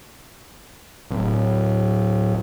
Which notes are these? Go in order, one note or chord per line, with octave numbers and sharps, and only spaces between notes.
D1